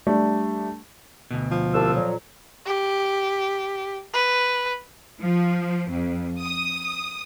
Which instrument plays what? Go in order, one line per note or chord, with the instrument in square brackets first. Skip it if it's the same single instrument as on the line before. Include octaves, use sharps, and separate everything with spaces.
[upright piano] G3 A3 D4
[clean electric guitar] D2 B2
[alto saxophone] F3
[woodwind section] C2 D4 E6
F2 A#2 F#3
[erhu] G4
B4
[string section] F3
F2
D#6